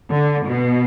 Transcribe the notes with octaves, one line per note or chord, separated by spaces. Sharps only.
D3
B2